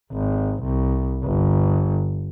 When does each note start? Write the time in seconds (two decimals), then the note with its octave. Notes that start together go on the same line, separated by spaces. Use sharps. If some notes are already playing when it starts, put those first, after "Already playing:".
0.13 G#1
0.63 C2
1.24 G1